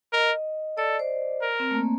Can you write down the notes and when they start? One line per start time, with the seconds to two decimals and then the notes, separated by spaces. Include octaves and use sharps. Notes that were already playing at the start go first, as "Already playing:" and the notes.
0.12 A#4 D#5
0.78 A4 D5
0.99 C5
1.42 A#4
1.60 C4
1.71 A3
1.75 A#3